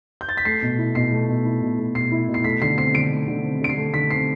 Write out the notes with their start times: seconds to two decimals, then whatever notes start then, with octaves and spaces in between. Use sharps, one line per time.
0.21 G6
0.29 A6
0.37 B6
0.45 A3 C7
0.62 B2
0.78 E4
0.95 B2 C7
1.12 A3
1.29 B2
1.45 E4
1.62 B2
1.79 A3
1.95 B2 C7
2.12 E4
2.28 B2
2.34 C7
2.44 A3 B6
2.61 D3 C7
2.78 C4 C7
2.94 D3 D7
3.11 A3
3.28 D3
3.44 C4
3.61 D3 D7
3.69 C7
3.77 A3
3.93 D3 B6
4.10 C4 C7